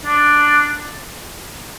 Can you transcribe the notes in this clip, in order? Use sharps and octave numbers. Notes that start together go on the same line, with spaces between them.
D4